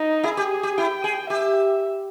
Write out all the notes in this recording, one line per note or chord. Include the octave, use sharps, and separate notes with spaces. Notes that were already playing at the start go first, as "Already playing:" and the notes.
Already playing: D#4
E4 G#4
G4
G4
E4 G5
G#4
G4 E5